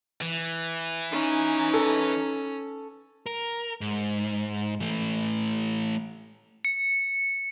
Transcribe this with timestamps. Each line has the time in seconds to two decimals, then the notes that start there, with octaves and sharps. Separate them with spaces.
0.22 E3
1.12 C#4 D#4
1.74 A4
3.26 A#4
3.81 G#2
4.80 E3 A3
6.65 C#7